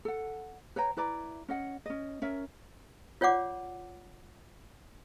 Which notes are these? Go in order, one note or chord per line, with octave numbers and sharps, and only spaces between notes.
A4 F#5
B4 C#5 G5 A#5
E4 B4 D5 A#5
C#4 D#5 F#5
C#4 D#5
C#4 A#4 C#5 E5
F4 C#5 D5 F#5 D6